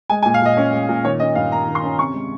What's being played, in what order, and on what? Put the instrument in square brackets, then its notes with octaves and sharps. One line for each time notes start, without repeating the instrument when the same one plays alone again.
[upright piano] G#3 G#5
G#5
A#2
F5
A#2 D#5
C#4
G#3
A#2
D#3 C#5
C#4 D#5
G2 F5
A#3 A#5
D#3
C6
C#4
C3 C#6
G#3